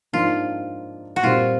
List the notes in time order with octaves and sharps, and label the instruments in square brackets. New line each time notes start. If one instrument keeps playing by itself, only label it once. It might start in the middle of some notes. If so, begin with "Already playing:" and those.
[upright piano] G#2 F3 A#3 D4 [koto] F4
[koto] F#4
[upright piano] A#2 G3 C4 [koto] F4